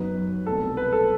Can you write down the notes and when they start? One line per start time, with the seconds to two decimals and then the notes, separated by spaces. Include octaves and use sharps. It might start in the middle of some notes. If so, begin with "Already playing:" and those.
Already playing: F#2 F#3 B3 D#4 B4
0.46 C2 B2 A3 A4
0.77 B4
0.92 A4